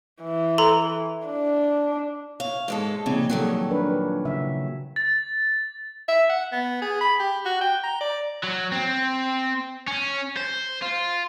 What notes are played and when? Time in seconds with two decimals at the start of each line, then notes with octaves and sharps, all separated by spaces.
0.23 E3
0.58 A4 A#5 C6
1.27 D4
2.40 C#5 F5
2.68 G#2 G#3 A4
3.06 A#2 C#3 F3 C4 D#4
3.30 A#2 D#3 F#3 G3 G#4 A4
3.70 D4 A#4 B4
4.25 C#3 E5
4.96 A6
6.09 E5
6.30 F#5
6.53 B3
6.82 G#4
7.01 B5
7.20 G4
7.46 F#4
7.61 G5
7.84 A#5
8.01 D5
8.44 F#3
8.72 C4
9.87 C#4
10.37 C5
10.82 F4